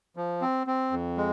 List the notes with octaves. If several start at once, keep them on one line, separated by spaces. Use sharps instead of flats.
F3
C4
C4
F2
G#3